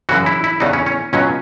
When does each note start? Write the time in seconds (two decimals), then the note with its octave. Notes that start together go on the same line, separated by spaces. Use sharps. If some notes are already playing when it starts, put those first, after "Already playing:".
0.09 F#2 C#3 E3 F#4
0.26 E4
0.44 E4
0.60 E2 C#3 E3 D#4
0.73 C#4
0.86 C#4
1.13 C#2 B2 F#3 C#4